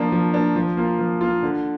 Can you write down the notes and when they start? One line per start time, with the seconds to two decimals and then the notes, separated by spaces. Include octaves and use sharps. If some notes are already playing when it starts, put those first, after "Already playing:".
Already playing: F3 A#3 D4
0.12 F3
0.34 A#3 D4
0.56 F3
0.77 A#3 F4
0.99 F3
1.21 A#3 F4
1.43 D3